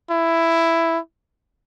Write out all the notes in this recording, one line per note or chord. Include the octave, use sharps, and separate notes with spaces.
E4